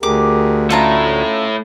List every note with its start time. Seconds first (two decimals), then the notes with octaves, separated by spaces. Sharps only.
0.03 D2 G4 G#4 A#4 D6
0.70 A3 C#4 E4 F4 A5 A#5